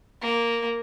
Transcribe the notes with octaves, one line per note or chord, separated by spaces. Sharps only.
A#3